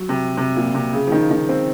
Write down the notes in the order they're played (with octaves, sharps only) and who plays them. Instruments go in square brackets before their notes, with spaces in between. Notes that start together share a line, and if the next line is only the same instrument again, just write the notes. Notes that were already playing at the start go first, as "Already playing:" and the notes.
Already playing: [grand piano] F#3
C3
C3
A#2
C3
C#3
F3
D#3
D#3
C4